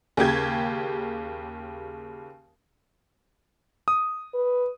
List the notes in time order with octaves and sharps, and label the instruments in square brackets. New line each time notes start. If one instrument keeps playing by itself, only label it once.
[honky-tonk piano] D#2 C#3 G4 G#6
[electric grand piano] D#6
[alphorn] B4